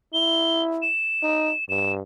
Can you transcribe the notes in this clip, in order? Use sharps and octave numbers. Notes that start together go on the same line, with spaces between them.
E4 G7
E7
D#4
G2 E7